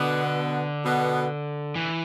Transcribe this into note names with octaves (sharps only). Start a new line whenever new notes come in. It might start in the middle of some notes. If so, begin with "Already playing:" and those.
Already playing: B2 D3 B3
B2 B3
E3